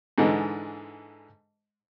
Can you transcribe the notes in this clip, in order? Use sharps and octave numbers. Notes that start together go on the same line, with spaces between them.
G#2 D3 E3 G#3